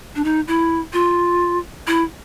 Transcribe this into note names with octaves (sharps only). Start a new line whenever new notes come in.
D4
D#4
E4
F4
E4